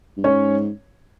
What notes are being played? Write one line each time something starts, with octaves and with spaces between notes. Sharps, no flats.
G2
G#2 C#4 C#5